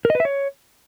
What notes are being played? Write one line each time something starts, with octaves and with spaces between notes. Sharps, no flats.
A#4
D#5
B4
E5
C#5